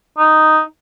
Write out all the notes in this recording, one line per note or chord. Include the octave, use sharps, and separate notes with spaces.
D#4